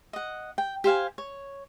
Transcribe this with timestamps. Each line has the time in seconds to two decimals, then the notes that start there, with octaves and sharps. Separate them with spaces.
0.13 D#5 F#5
0.58 G5
0.84 G4 C5 F5 G#5
1.18 C#5